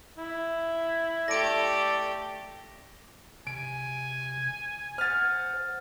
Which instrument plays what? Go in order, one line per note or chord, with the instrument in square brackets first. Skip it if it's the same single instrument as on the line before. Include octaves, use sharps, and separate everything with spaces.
[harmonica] E4
[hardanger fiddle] A3 G4 [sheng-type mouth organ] A4 D5 [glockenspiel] A#6 D7
[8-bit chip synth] C3 [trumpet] G#5 [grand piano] D7
[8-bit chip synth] C5 F#5 [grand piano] F6 A6